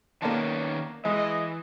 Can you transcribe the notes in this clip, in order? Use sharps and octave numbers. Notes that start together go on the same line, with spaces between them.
D#3 A#3 B3 C#4 D5 A5
E3 G#3 D#5